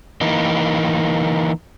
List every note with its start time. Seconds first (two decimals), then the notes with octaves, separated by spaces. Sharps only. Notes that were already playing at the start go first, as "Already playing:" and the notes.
0.21 E3 A#3 D#4